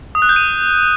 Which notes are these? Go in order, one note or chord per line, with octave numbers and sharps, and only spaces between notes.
D#6
F#6
G6
D#7